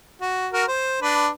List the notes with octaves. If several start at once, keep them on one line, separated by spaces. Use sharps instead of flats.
F#4
F#4 A#4
C5
D4 B4